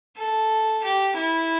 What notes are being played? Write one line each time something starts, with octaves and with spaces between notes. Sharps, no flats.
A4
G4
E4